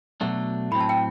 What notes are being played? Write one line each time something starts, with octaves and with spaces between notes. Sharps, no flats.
B2 F#3 A3 D4
A2 F#3 C4 B5
A5
G5